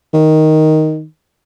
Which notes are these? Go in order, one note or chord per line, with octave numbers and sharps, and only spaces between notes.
D#3